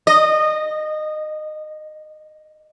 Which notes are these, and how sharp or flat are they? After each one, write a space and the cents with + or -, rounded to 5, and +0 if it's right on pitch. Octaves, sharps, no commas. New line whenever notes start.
D#5 -20